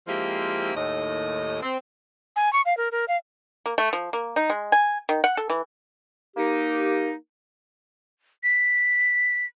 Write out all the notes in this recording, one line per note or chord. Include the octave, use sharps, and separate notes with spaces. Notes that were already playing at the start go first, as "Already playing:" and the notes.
F3 G#3 A#3 C4 E4 G4
D#2 A2 D#5
C4
G#5
C#6
F5
A#4
A#4
F5
A#3
A3
F3
A#3
D#4
G#3
G#5
D#3
F#5
A4
E3
A#3 D#4 G4
B6